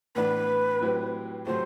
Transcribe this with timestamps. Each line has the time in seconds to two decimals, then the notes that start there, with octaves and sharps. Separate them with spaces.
0.15 A2 E3 B3 D4 B4
0.80 A2 F#3 C4 E4 G4
1.46 C3 F#3 A3 C5